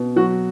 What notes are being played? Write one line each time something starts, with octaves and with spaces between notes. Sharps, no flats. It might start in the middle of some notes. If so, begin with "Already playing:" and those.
Already playing: B2
F#3 F#4